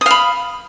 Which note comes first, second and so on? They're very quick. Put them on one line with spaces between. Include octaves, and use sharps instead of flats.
D#6 F5 B5